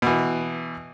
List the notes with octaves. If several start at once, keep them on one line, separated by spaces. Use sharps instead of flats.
B2 E3